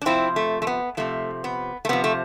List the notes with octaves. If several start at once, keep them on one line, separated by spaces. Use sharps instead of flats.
D4
C3 F3 C4 E4
A3
A3
B3
C3 F3 A3
B3
A3
C3 F3 B3
A3